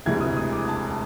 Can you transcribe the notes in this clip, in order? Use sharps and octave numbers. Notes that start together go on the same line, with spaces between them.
E1 D2 C3 E3 G#3 G#6
D#6
D#6
D6
A5
A5